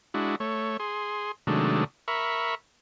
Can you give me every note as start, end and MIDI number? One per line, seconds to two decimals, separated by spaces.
0.14 0.36 56
0.14 0.36 62
0.14 0.36 64
0.14 0.36 66
0.40 0.77 57
0.40 0.77 73
0.80 1.32 68
0.80 1.32 84
1.47 1.84 48
1.47 1.84 51
1.47 1.84 54
1.47 1.84 56
1.47 1.84 57
1.47 1.84 62
2.08 2.55 70
2.08 2.55 76
2.08 2.55 83
2.08 2.55 85